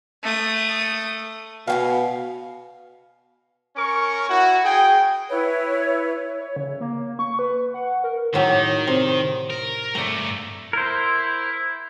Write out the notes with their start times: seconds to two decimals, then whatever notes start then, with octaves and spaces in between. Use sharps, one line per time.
0.23 A3 D#6
1.67 B2 F5 G5 G#5
3.75 C#4 A#4 C#6
4.28 E4 F#4
4.63 G#4 G5
5.29 E4 B4 C#5
6.40 C#5
6.56 C#3
6.81 A#3
7.19 C#6
7.39 B4
7.74 F#5
8.04 A#4
8.34 A2 D#3 F#3 G4
8.87 C3
9.50 A#4
9.95 G2 A3 D5 A#5
10.73 E4 A#4 C5